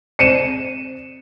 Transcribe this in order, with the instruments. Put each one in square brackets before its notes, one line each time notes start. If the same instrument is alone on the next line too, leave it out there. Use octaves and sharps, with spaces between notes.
[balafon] C4 C5 D5 [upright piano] C#7 D#7 E7